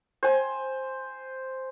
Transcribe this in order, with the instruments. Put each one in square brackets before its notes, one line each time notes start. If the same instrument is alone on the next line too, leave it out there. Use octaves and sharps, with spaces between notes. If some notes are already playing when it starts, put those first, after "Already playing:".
[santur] C5 G#5